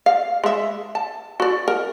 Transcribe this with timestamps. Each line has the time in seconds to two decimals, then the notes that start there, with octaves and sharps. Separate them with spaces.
0.06 F5
0.44 G#3 E5
0.95 A5
1.40 F#4 D5
1.68 A#4